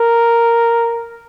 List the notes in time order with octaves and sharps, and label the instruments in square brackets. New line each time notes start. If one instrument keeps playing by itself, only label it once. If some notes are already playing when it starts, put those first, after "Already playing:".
Already playing: [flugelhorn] A#4